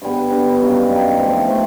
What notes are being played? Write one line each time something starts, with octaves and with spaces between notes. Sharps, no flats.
G2 D3 G3 B3
G2 D3 G3 B3
F#2 D#3 G3 A#3
F#2 D#3 G3 A#3
F3 A3 C4
F3 A3 C4